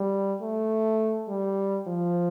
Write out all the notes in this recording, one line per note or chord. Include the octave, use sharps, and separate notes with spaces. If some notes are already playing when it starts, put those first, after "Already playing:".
Already playing: G3
A3
G3
F3